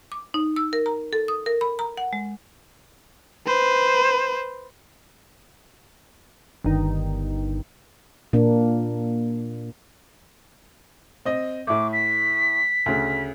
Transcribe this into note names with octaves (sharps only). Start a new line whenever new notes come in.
D6
D#4
E6
A#4
A#5
A4
D#6
A#4
B5
A#5
F#5
G#3
B4 C5
G1 D#3
A#2 A#3 D4
C4 D#5
A2 A3 D6
B6
D2 C#3